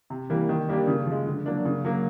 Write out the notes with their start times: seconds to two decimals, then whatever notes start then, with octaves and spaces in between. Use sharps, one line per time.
0.10 C3
0.30 E3 G3 A#3
0.49 D#3
0.69 G3 A#3 D4 G4
0.87 C#3
1.06 F3
1.12 G#3
1.26 D3
1.46 F#3 A#3 D4
1.65 C#3
1.85 F#3 A#3